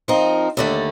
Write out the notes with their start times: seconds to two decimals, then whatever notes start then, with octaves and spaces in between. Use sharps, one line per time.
0.08 F3 C4 D#4 A#4
0.57 D#2 D3 A3